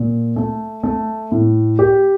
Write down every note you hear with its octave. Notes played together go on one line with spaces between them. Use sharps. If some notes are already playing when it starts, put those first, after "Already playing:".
Already playing: A#2
A3
A3
A2
G4